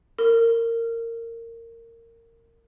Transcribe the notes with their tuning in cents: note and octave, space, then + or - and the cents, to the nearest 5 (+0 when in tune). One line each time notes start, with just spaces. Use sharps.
A#4 -20